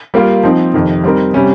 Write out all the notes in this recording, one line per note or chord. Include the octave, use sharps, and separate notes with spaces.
G3 A#3 F4
F3 C4 D#4
F2 C3 D#3
G3 C4 D#4 A#4
C3 G3 C#4